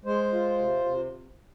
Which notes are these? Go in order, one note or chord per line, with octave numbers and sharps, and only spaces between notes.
G#3 C5
F4
C3
C3